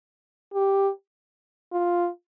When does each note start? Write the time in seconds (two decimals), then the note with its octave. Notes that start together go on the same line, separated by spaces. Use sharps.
0.54 G4
1.72 F4